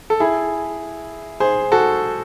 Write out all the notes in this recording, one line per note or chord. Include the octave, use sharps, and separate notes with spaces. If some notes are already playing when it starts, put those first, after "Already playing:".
A4
E4 G#4
G#4 C5
F#4 A4